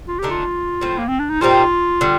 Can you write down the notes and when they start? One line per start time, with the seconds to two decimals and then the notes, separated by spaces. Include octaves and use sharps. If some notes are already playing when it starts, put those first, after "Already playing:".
0.08 F4
0.19 D3 A3 D#4 G4
0.31 F4
0.81 A2 F3 C4
0.99 A#3
1.09 C4
1.20 D4
1.30 D#4
1.41 A#2 G3 C4 D#4 F4
2.01 D3 G3